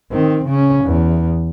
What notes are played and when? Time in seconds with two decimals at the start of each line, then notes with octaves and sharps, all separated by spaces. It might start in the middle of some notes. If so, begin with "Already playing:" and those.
0.12 D#3 C4
0.45 C#3 C#4
0.84 E2